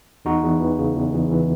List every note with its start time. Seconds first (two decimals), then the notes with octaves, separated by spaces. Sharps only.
0.25 E2 D#4 F#4
0.43 E2
0.60 E3
0.79 C#3
0.96 E2
1.13 E2
1.31 E3